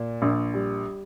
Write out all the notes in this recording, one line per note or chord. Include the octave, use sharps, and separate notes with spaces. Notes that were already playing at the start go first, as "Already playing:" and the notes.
Already playing: A#2
A#1
G3